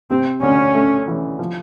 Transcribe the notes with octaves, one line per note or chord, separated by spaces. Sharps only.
C3 C4
D2 C#4
A3
E3
F3